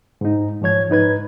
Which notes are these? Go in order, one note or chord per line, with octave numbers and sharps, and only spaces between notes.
G#2 D#4
G#2 F3 C#5 G#6
G#2 D#4 B4 G#6